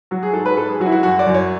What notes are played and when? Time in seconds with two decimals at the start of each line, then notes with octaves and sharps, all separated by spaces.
0.11 F#3 F#4
0.23 G#4
0.34 G#2 A4
0.46 B4
0.57 G#2 A4
0.69 G#4
0.80 F#3 F#4
0.86 E4
0.92 F#4
1.03 F#2 F#4
1.19 D5
1.26 F#2
1.34 C#5